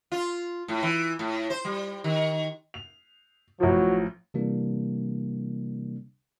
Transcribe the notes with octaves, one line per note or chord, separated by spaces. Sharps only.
F4
A2
E3
A2
C5
G3
D#3
F7
A1 F3 F#3
C3 E3 G3 A#3 D4